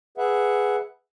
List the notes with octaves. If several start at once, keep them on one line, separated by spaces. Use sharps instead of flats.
G#4 B4 E5 F#5